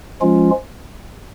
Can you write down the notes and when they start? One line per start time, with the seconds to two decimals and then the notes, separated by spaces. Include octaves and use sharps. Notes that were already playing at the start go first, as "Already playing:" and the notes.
0.21 F3 G#3 C#4 F4